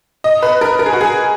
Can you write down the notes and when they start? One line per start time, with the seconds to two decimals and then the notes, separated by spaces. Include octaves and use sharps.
0.24 D#5
0.43 B4
0.61 A#4
0.79 A#4
0.86 G#4
0.93 F#4
1.01 G#4